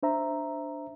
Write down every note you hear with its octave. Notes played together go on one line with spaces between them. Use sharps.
D4 C5 E5 A#5